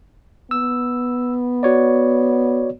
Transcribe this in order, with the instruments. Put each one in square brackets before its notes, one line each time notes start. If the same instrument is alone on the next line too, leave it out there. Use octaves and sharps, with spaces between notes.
[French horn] B3 [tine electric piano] E6
[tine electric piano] F#4 C#5 D5